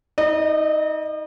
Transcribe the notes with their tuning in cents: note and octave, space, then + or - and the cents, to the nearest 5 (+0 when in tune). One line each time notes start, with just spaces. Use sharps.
D#4 +35 D#5 -35